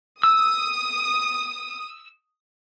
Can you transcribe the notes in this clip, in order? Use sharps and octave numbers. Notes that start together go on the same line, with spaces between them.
D#6 E6